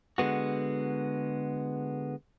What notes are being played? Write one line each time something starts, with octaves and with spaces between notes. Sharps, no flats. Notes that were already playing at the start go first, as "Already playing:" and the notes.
D3 G#3 B3 F#4